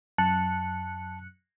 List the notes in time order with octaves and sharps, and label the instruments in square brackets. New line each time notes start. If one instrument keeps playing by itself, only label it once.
[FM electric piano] F#2 F#6 C#7 [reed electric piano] A5